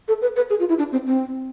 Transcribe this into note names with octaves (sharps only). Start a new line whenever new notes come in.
A4
B4
B4
G#4
F4
E4
D4
C4
C4